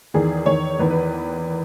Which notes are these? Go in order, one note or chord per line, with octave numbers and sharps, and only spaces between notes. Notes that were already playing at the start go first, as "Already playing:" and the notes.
E2 D#3 G#4
E2 D#3 C#5
E2 D#3 B4
B4